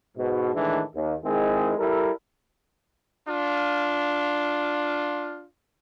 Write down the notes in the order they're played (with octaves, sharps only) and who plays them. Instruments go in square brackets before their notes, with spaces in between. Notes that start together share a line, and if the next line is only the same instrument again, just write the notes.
[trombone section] G#2 B2
A2 D#3 E3 G#3 D4
D#2
D#3 G#3 C4 E4 G#4
G3 E4 A4 A#4
[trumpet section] D4 F4